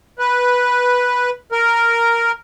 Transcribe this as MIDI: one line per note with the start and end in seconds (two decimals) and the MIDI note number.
0.19 1.30 71
1.52 2.32 70